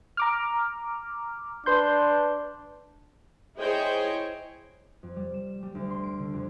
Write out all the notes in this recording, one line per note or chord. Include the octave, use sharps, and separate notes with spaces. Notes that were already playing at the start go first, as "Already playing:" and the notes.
A#5 D6 F6
D4 B4 C6 G6
E4 G#4 C5 C#5 D#5 G5
F2
G3
E7
G3
D2
C6
D7
D3
F2